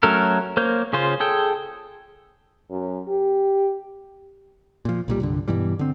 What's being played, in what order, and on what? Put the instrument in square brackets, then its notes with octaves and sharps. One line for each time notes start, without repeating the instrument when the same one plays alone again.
[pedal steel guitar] F#3 A3 C#4 A4 A#4
A#3 C5 C#5 G6
C#3 C#4 F4 C5
G#4 A4 G5
[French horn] F#2
G4
[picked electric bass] A#2 F3
B1 A#2 G3
C2 G2 D3
G2 B2 E3 G3
D3 C4